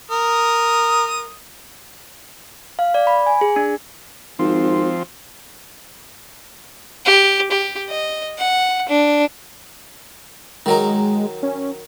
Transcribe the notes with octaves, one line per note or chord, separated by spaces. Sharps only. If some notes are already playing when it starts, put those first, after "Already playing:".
A#4 D#6
F5
D5
B5
G#5
G#4
D4
G#1 F3 C4
G4
G4
D#5
F#5
D4
D#3 F#3 G#3 A#4
C#4